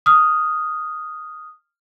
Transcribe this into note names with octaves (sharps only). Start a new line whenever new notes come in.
D#6 F6